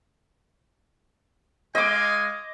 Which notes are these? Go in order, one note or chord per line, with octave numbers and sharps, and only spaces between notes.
G#3 D#5 F5 G#5 D6